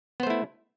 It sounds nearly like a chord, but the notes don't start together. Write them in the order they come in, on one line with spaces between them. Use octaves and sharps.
B3 C5 A3 E4